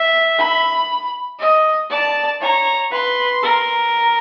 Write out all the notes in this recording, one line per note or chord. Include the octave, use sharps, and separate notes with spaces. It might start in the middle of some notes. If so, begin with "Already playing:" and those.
Already playing: E5
B5
D#5
D5 A5
C#5 A#5
B4 C6
A#4